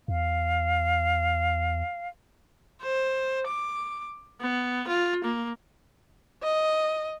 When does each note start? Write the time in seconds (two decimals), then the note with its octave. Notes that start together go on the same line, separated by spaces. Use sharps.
0.08 E2 F5
2.81 C5
3.47 D6
4.41 B3
4.87 F4
5.24 A#3
6.43 D#5